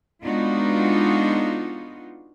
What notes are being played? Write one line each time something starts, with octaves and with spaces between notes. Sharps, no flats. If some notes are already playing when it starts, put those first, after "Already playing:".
G#3 B3 D4 D#4 F4 F#4